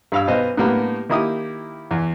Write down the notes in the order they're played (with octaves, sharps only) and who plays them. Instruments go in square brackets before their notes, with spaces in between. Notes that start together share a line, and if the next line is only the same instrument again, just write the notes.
[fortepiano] G2 F5 E6
B1 B3 C5 D#5 F5
A2 D3 G3 A#3 B3
D#3 A#3 E4 G4 D#6
E2